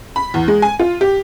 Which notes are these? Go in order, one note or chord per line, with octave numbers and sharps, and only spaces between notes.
B5
E2
G#3
G#5
F4
G4